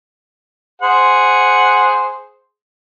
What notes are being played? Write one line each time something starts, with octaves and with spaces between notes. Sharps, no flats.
G#4 C5 F#5